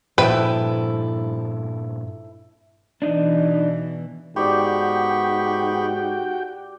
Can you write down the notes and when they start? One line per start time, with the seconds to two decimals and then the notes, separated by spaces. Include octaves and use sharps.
0.18 G2 A#2 F3 E4 A4 B4 C5 G5
3.02 B2 E3 D4 D#4
4.36 G#2 B3 F#4 G4 D5 G5 B5 C#6